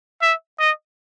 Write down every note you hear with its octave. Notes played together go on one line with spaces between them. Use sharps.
E5
D#5